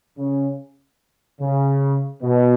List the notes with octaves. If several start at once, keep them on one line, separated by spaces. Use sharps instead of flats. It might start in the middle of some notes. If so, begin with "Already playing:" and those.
C#3
C#3
B2